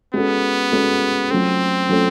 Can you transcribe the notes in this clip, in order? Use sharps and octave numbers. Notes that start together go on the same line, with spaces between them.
G#3 B3 C#4 F#4 A4
G#3 C#4 F#4 A4
F#3 A3 C4 C#4 F4 A4
F#3 A3 C#4 F4 A4